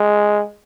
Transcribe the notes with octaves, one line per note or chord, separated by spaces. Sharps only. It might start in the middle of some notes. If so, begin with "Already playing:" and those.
Already playing: G#3